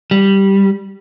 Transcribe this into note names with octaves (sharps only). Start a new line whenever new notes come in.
G3